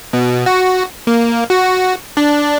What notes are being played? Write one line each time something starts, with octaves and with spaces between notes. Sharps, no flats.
B2
F#4
A#3
F#4
D4